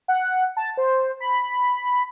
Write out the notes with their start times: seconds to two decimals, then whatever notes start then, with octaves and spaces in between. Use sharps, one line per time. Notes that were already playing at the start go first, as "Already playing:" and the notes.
0.08 F#5
0.57 A5
0.77 C5
1.20 B5